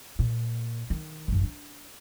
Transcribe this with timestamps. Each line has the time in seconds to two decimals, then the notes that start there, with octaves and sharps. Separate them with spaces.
0.19 A#2
0.90 D#3
1.28 A1 F#2
1.43 D4